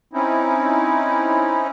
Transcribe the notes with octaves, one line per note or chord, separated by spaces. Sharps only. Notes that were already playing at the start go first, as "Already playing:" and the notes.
C4 C#4 D#4 E4